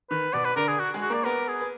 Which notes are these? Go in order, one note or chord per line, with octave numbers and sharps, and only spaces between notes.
D#3 B4
B2 B3 D5
B4
D3 D4 A#4
G#4
F#4
G#3 G#4
F#4
A#3 A#4 D5
B3 A#4 B4
G#4
B4